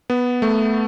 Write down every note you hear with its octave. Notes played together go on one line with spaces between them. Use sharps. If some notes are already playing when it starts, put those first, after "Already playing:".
B3
A3